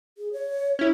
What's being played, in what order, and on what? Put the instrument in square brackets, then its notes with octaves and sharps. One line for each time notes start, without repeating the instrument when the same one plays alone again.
[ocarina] G#4
C#5
[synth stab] C#4 E4